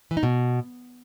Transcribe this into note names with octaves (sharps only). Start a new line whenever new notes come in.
E3
D#4
B2